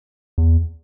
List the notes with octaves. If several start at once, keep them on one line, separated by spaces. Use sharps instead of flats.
E2